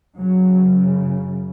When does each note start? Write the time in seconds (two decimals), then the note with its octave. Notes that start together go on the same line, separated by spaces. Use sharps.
0.18 F#2 C#3 F#3